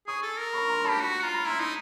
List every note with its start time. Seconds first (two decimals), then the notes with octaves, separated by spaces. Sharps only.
0.07 G#4 C#6 D#6
0.22 A4
0.38 A#4
0.53 B5 C#6
0.69 A#5 C6
0.85 G4 A5 B5
1.00 F#4 B5 C#6
1.23 F4 A#5
1.34 B5
1.46 E4 A#5 C6
1.60 D#4